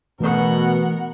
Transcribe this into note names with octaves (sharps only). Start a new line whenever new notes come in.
B2 E3 A3 B3 C#4 F#4 A#4 F#5